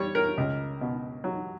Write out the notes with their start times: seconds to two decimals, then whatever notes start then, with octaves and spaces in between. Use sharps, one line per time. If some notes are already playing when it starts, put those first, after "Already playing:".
Already playing: G3 C#5
0.15 A#4
0.38 C#2
0.81 B2
1.24 F#3